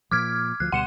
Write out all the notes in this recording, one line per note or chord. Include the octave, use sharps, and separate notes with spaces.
A#2 F3 D6 F6 G#6
D2 F3 F#6
D2 B2 G3 F#5 C#7 E7